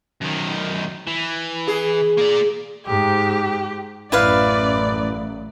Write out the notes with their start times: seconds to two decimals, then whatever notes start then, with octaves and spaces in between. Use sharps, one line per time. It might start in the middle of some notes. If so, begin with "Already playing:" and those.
0.22 F#2 D#3
1.07 E3
1.68 G#4
2.18 A#3 D5
2.87 G#2 G4
4.12 A1 F#2 E4 B4 D5 F5